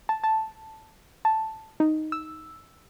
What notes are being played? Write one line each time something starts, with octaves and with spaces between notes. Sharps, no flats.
A5
A5
A5
D#4
E6